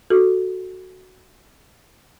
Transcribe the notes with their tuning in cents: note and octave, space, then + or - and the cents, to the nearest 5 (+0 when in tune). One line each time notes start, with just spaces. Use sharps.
F#4 +0 A4 +0